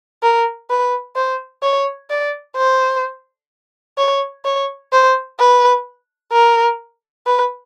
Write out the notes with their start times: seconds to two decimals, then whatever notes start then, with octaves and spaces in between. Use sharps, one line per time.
0.23 A#4
0.70 B4
1.16 C5
1.63 C#5
2.10 D5
2.57 C5
3.98 C#5
4.45 C#5
4.92 C5
5.39 B4
6.32 A#4
7.26 B4